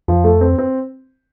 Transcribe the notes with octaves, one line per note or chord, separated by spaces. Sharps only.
F2 F3
A3
C4
C4